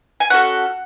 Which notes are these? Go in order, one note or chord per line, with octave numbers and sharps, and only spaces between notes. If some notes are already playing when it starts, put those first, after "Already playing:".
G#5
C#4 F#4 A4 F#5